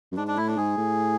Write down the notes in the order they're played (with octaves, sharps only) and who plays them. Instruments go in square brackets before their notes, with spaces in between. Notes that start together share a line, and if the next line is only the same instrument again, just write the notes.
[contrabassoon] F#2
[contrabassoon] G#2 [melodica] D4
[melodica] D4
[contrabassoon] A2 [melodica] E4
[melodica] D4
[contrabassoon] G#2 [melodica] G#4
[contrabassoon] A2